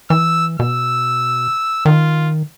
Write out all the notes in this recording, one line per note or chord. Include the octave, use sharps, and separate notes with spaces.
E3 E6
B2 E6
D#3 F4